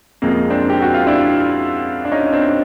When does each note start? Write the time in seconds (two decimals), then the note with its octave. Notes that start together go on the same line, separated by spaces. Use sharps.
0.22 F2 C3 F3 G#3 A#3
0.50 C4 D4
0.70 G4
0.82 F#4
0.94 F4
1.06 D4 E4
2.05 D4
2.11 C#4 D#4
2.33 C4 D4